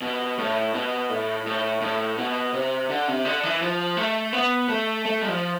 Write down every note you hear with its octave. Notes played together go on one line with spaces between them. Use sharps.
B2
A2
B2
A2
A2
A2
B2
C3
D3
C3
D3
E3
F3
A3
B3
A3
A3
G3
F3